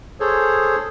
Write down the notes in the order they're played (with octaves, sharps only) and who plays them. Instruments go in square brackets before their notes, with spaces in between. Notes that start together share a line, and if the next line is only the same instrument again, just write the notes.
[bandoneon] G#4 A4 C5 C#5